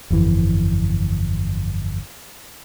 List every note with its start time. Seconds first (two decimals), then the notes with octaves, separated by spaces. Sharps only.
0.10 G1 F2 E3